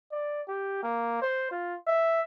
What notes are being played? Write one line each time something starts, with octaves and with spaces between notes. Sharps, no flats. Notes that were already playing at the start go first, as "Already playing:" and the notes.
D5
G4
A#3
C5
F4
E5